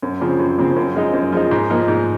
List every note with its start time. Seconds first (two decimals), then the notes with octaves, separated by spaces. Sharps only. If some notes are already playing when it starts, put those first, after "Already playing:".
0.03 F#2
0.20 C#3 F3 C4
0.39 F#2
0.58 C#3 F3 C4
0.76 F#2
0.95 F3 G#3 D#4
1.13 F#2
1.32 F3 G#3 D#4
1.51 G#2
1.70 F3 A#3 D#4
1.88 G#2